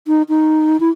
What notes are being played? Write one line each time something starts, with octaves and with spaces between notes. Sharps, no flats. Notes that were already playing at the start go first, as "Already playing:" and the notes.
D#4
D#4
E4